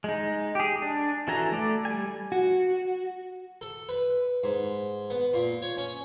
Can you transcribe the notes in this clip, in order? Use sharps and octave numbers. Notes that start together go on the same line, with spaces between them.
G#3 D#4
G4 G#4
D4
E3 F#4 A4 G#5 A#5
A3 A4 D5
G3 G#5
F#4
A4
B4
G#2
B3
A#2
C#5
C#4